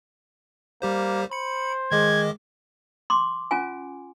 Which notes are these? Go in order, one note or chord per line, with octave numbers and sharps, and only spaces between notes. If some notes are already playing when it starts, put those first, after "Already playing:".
G3 A#3 G4 C5
C5 B5 C#7
D#3 G#3 D#5 D6 G#6
C6 D6
C#4 F4 G#5